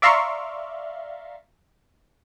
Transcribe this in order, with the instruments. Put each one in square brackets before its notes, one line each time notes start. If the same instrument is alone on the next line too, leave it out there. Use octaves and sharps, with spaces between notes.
[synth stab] D5 E5 F5 A#5 C6 C#6